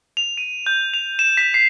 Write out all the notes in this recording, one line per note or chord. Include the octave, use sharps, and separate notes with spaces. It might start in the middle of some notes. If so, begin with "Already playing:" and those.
F7
D#7
G6
F7
E7
B6
C7